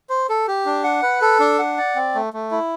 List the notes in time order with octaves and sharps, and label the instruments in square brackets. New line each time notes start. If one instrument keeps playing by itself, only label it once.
[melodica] C5
A4
G4
D4
F#5
B4
A4
D4
F#5
D5
C4
A3
A3
E4